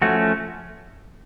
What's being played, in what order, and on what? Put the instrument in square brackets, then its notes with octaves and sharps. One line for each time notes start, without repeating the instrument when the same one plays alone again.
[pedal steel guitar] F3 A3 C#4 F#4